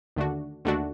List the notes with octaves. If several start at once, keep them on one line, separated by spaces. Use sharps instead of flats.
D#2 D3 A3 D4 F#4
D#2 D3 A3 D4 F#4